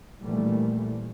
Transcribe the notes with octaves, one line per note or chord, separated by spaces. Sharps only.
A#1 A#2 E3 G3 A3